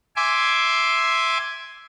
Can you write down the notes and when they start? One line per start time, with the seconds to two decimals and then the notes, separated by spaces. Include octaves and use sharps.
0.16 E5 G#5 C6 D6